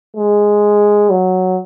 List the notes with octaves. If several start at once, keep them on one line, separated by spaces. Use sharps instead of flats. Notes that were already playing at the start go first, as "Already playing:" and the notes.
G#3
F#3